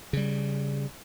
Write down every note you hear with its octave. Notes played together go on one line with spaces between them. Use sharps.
C#3 G3